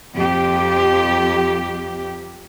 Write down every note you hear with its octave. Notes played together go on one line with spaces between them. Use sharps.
F2 G4